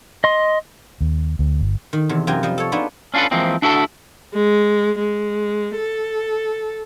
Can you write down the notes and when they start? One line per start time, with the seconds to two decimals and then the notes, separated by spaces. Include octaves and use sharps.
0.24 D#5 C6
1.01 D#2
1.39 D2
1.61 G1
1.93 D#3
2.09 E2 C3
2.27 F#2 C3 F4 A#4 G5 G#5
2.43 F3 G3 D#5
2.58 A4 C#5
2.72 B3 D4 D#4 F4 G#4
3.14 C#4 D4 F4 F#4 A4 B4
3.31 E3 F3 G#3 A#3 C4
3.62 D4 E4 F#4 A4 G#5 A5
4.34 G#3
4.99 G#3
5.77 A4